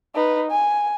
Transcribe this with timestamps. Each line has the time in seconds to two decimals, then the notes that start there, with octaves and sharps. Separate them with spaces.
0.15 D#4 B4
0.51 G#5